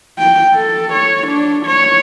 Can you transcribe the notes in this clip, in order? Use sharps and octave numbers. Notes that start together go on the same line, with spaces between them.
G5
A4
C#5
D4
C#5